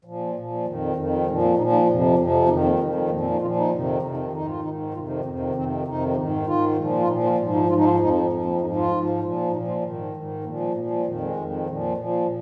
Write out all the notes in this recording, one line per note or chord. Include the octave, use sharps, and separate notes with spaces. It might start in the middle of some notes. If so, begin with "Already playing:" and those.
A#2 F3
A#2 F3
F2 D#3
F2 D#3
A#2 F3 G#3
C4
A#2 F3 D#4
D#4
F2 C3 F3
F2 C3 F3
F2 D#3 D#4
A#3
F2 D#3 G#3
G#3
A#2 F3 A#3
C4
D#4
A#2 F3 F4
D#4
F2 C3 D#3
F2 C3 D#3 D#4
C4
G#2 D#3 D#4
F4
G#2 D#3 D#4
F2 C3 D#3 F4
D#4
F2 C3 D#3 C4
D#4
F2 C3 D#3 C4
F2 C3 D#3 D#4
G#2 D#3
G#2 D#3 F4
A#2 F3
F4
A#2 F3 D#4
F4
G#2 F3 G#3
D#4
G#2 F3 F4
D#4
F4
F2 F3 D#4
F2 F3
A#3
G#2 F3 D#4
F4
G#2 F3
A#2 F3
A#2 F3 D#4
F4
G#2 D#3
G#2 D#3
A#2 F3 A#3
G#3
A#2 F3 A#3
G#3
F2 D#3 F3
G#3
F2 D#3
A#2 F3
A#2 F3